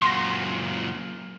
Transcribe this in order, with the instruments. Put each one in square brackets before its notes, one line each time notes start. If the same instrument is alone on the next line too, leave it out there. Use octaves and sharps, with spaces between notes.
[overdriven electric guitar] F#2 A#2 [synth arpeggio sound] C6 A#6